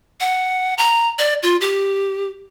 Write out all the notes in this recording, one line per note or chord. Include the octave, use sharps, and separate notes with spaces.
F#5
A#5
D5
F4
G4